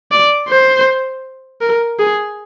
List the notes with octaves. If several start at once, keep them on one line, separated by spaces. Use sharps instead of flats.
D5
C5
A#4
G#4